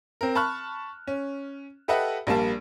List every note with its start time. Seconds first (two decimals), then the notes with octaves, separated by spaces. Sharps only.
0.21 C4 A#4
0.35 A5 B5 C#6 F6 F#6
1.07 C#4
1.88 G4 A4 B4 D#5 E5 F#5
2.27 A#1 G3 A#3 A5